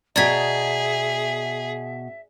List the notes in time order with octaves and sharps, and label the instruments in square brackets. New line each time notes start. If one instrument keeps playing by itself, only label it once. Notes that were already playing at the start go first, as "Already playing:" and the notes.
[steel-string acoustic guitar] B2 A#5 [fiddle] G#4 [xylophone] D5 G#6 B6 [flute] E5